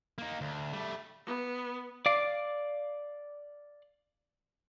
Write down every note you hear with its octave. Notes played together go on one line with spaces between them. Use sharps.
A#3 D#4
D2
G3 A3
B3
D5 F5 D6